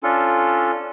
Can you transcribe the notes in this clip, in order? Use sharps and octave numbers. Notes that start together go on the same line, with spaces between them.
C#4 D4 F4 A4